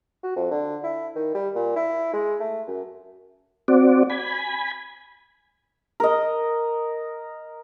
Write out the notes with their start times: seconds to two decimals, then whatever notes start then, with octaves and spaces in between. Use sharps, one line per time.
0.23 F#4
0.36 F2
0.51 D3
0.84 E4
1.16 D#3
1.35 G3
1.55 A#2
1.76 E4
2.13 G#3
2.40 A3
2.67 F#2
3.68 C4 F#4 D5
4.10 G#5 B5
6.00 A#4 D#5